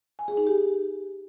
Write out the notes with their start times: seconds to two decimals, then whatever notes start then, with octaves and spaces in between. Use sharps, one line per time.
0.19 G#5
0.28 G#4
0.37 D#4
0.47 G4